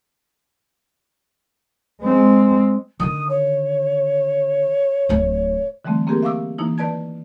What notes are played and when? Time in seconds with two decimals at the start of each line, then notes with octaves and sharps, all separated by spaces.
2.02 G#3 C4
3.00 D3 D#3 D#6
3.29 C#5
5.09 D1 E4
5.85 D3 E3 G3 A3 C4
6.07 A#3 C4 G4 G#4 A#4
6.22 E5 F5 C#6 D6 E6
6.58 E3 A#3 D#4 E4
6.78 D#3 B4 D5 A5 G#6